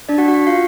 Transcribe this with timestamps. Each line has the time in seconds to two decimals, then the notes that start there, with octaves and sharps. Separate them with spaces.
0.09 D4 D5
0.18 F#4 F#5
0.28 F#4 F#5
0.47 F4 F5